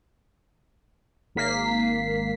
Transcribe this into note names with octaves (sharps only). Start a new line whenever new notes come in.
G#1 A#3 B6 C7